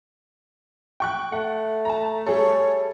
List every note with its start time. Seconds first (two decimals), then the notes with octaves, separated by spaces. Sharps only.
1.00 G5 C#6 F#6
1.32 A3 F#5
1.85 A5 A#5
2.26 G3 G#4 A4 C#5